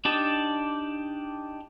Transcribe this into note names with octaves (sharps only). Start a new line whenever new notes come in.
D4 D#4 G4 A5